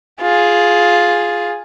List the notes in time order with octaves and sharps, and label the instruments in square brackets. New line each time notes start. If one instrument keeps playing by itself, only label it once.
[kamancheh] F4 G#4